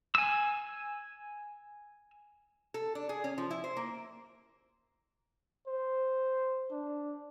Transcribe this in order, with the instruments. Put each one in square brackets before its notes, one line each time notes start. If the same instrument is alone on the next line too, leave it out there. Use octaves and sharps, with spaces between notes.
[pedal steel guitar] G#5 E6
[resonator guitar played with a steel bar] A4
D4
G#4
C#4
F3
E4
C5
A#3
[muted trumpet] C5
D4